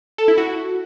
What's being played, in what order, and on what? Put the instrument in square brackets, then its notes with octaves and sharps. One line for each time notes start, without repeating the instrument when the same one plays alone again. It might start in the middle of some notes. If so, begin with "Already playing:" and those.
[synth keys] A4
E4
F#4